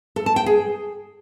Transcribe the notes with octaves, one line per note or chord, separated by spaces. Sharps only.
A4
A5
G5
G#4